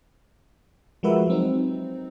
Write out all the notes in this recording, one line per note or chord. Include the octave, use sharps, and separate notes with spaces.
F3 G#3 F#4 A#4 B4 E5
F#3 C4 D#4